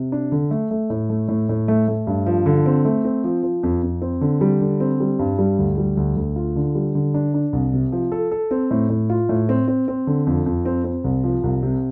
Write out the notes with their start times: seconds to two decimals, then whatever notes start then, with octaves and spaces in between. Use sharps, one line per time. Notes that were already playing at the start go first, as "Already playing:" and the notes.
Already playing: C3
0.12 D4
0.32 D3
0.51 A3
0.71 A3
0.90 A2
1.09 A3
1.28 A2
1.49 A2
1.68 A3
1.88 A3
2.07 G2
2.26 F3
2.46 D3
2.66 C4
2.85 A3
3.05 C4
3.24 F3
3.43 F3
3.63 F2
3.83 F2
4.02 C4
4.21 D3
4.41 G3
4.61 D3
4.80 C4
5.00 G3
5.19 G2
5.38 G3
5.58 D2
5.78 G3
5.97 D2
6.16 D2
6.36 F4
6.56 D3
6.75 G3
6.95 D3
7.14 D4
7.34 D4
7.53 C2
7.73 C3
7.92 F3
8.12 A4
8.31 A4
8.51 C4
8.71 A2
8.90 A2
9.10 F4
9.29 A2
9.49 C4
9.68 C4
9.88 C4
10.07 D3
10.27 F2
10.46 F2
10.65 C4
10.84 C4
11.04 C2
11.24 F3
11.44 C2
11.63 C3